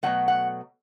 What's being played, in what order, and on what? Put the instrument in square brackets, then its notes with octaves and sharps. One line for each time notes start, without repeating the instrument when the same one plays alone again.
[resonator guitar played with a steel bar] B2 F#3 A3 F#5
F#5